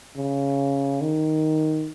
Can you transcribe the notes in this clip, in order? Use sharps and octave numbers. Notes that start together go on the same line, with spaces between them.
C#3
D#3